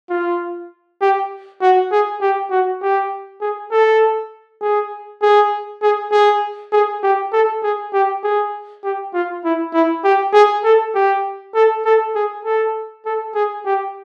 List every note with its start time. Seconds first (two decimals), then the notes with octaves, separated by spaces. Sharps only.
0.10 F4
1.01 G4
1.62 F#4
1.92 G#4
2.21 G4
2.51 F#4
2.82 G4
3.41 G#4
3.72 A4
4.62 G#4
5.22 G#4
5.83 G#4
6.12 G#4
6.73 G#4
7.03 G4
7.32 A4
7.63 G#4
7.93 G4
8.24 G#4
8.84 G4
9.13 F4
9.44 E4
9.73 E4
10.04 G4
10.33 G#4
10.64 A4
10.95 G4
11.55 A4
11.85 A4
12.15 G#4
12.45 A4
13.06 A4
13.35 G#4
13.66 G4